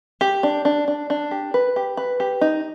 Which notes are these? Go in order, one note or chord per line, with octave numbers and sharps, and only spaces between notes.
G4
D4
D4
D4
D4
G4
B4
G4
B4
G4
D#4